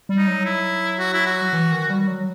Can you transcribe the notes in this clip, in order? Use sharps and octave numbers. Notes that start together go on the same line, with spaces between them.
G3
D#4
F#3
E4
F#4
E4
F#4
E3
D#3
G3
F#3